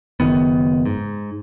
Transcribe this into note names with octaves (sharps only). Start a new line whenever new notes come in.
F#1 D#3 B3
G#2